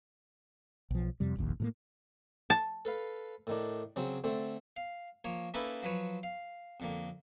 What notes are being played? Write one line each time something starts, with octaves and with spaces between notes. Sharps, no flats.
B1 F3
F2 C3 G3
F1 A#1 D#2
A2 E3 A#3
A5
A4 B4 F5
A2 D#3 D4
C#3 F#3 C4
D3 A3 C4
F5
F3 A#3 C#5
A#3 C#4 D#4 E4 A4 B4
F3 F#3 B4 C#5
F5
F2 D3 A#3